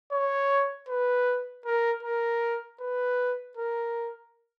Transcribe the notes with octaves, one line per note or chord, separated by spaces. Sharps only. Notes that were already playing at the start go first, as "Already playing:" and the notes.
C#5
B4
A#4
A#4
B4
A#4